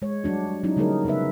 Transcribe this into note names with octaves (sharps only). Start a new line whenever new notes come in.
G#3 C#5
F#3 G3 D4 F#4
F#3 C#4 D#4 E4
D3 G3 A#3 D#4 G#4 A#4
C#3 B3 D#4 B4 E5